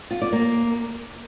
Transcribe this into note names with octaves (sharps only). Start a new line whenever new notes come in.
F4
D5
A#3